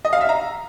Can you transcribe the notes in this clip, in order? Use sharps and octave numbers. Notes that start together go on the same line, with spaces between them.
D#5
F5
E5
A#5